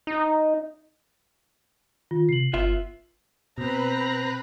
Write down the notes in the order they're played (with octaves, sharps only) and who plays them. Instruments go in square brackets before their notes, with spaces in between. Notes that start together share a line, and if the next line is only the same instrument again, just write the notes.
[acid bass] D#4
[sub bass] D#3 [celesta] F4
[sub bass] C3 [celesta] C7 F#7
[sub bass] G1 [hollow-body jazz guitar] B3 F4 E5
[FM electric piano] B2 [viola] C4 A#5 [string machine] B4 B5 F#6